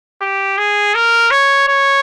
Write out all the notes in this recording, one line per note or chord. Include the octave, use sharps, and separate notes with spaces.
G4
G#4
A#4
C#5
C#5